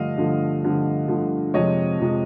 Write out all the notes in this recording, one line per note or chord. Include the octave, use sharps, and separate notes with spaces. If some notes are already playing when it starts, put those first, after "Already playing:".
Already playing: G2 D3 F3 A3 D#5 F5
G2 D3 F3 A3
G2 D3 F3 A3
G2 D3 F3 A3
F2 C3 F3 G#3 C#5 D#5
F2 C3 F3 G#3